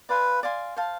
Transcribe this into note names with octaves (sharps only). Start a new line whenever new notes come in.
B4 D5 F5 G#5 C6
D5 F5 G#5 C6
C5 F5 A5